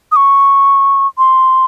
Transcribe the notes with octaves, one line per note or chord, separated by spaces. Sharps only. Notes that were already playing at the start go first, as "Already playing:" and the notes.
D#6
C#6
C6